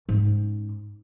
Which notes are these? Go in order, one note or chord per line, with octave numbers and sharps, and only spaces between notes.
G#2 C#4